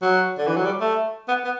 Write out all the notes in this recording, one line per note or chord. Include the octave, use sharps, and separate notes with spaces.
F#3
D3
E3
F#3
G3
A3
B3
B3